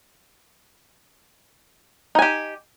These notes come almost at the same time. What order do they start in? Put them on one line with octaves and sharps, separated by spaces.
D#4 G#5 G4